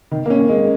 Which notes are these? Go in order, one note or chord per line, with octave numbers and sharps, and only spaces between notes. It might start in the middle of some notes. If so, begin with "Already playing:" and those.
D#3
A#3
C#4
G#3